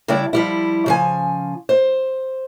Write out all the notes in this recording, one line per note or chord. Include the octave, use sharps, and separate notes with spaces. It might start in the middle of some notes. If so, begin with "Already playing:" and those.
C#3 G3 D4 E4 D5
F3 G3 E4
C#3 F3 G#5
C5